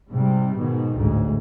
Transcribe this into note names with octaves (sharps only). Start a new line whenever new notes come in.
G#2 C3 G3
G#2 B2 D#3
A1 D2 G#2